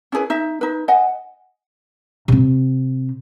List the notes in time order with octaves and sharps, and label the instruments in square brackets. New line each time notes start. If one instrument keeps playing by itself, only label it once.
[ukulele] C#4 E4 G#4 B4
D#4 E5
D#4 B4
D#5 F#5 G#5
[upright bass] C3 C4